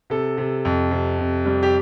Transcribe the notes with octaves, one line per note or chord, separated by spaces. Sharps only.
C3 A4
C3
F2
C3
C3
G3
G4